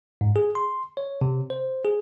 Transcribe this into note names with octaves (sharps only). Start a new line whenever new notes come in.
G#2
G#4
C6
C#5
C3
C5
G#4